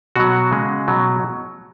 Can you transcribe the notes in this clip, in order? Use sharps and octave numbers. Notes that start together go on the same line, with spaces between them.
B2 F#3 F#4
C#3 G#3
B2 F#3